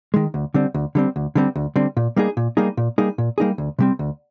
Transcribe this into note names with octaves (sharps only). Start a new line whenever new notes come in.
D#3 G#3
D2
D3 G3 C4
D2
D3 G3 C4
D2
D3 G3 C4
D2
D3 G3 C4
A#2
G3 A#3 D#4 G#4
A#2
G3 A#3 D#4 G#4
A#2
G3 A#3 D#4 G#4
A#2
G3 A#3 D#4 G#4
D2
C3 G3 C4
D2